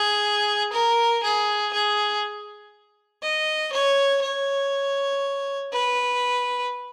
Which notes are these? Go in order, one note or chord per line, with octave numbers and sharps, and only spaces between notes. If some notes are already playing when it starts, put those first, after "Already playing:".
Already playing: G#4
A#4
G#4
G#4
D#5
C#5
C#5
B4